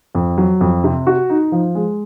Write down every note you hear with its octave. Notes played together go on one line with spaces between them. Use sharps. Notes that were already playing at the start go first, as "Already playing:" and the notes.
F2
F#3
F2
C3
F#4
D#4
F3
G#3